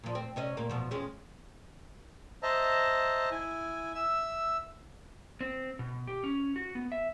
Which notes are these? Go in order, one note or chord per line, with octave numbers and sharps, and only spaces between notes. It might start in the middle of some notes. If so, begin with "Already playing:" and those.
A#2 F3
C4
C3 C#4 D#5
A#2 A#3
E2 B2 F3
F2 G#3 C#4
C5 D#5 E5 A5 A#5
E4 G#5
E5 E6
C4
B2
G4
C#4
F#4
B3
E5